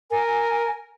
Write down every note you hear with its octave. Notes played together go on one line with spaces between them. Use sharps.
A#4 G#5